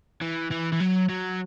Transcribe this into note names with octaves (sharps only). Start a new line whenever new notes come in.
E3
E3
E3
F#3
F#3